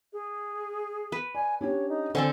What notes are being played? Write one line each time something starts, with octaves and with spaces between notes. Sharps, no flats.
G#4
B4
D5 G#5
C#4 D4 G4 C#5
D#4
D3 C4 A4 C5 G#5